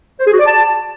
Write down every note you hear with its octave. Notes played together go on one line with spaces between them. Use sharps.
C5
G#4
F#4
D5
A5